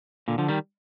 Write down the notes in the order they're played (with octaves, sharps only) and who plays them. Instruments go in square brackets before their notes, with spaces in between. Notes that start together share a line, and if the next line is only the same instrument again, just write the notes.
[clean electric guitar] A#2 D3
D3 F3
D#3 G3